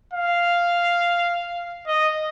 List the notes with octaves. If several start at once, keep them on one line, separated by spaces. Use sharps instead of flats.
F5
D#5